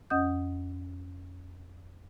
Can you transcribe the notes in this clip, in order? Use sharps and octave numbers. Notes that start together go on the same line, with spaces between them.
F2 C#4 D#5 F#5 D#6 G6